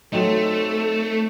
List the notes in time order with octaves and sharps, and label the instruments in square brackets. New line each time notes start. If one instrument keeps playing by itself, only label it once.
[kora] F#3 C4 D#4 [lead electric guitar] A3 [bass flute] A4